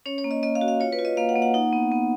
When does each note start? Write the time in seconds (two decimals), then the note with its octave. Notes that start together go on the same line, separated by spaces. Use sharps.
0.06 C#4 C#5
0.18 C#5
0.24 A#3
0.31 D#5
0.43 A#3 D#5
0.55 F5
0.61 F#4
0.68 F5
0.80 F4 C#5
0.92 B4
0.99 F4
1.05 D#5
1.17 A#3 F5
1.29 F#5
1.36 A#3
1.42 F#5
1.54 D#4 F#5
1.73 B3
1.91 B3